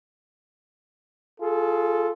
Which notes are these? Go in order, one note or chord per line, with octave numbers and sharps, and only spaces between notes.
F4 G#4 A4